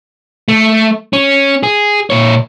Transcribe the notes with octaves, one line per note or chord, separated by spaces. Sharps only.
A3
C#4
G#4
A#2 C#5